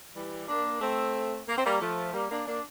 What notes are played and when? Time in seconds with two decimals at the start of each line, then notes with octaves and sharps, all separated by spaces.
0.16 E3 G3
0.48 A#3 D4
0.81 A3 C4
1.48 A#3
1.57 C4
1.66 G3 A#3
1.81 F3 A3
2.14 G3 A#3
2.31 A#3 D4
2.47 A#3 D4